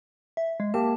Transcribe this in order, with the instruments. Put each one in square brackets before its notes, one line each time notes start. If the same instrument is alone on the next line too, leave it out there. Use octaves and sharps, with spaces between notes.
[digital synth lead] E5
G#3
[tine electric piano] A#3 G4 [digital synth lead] A5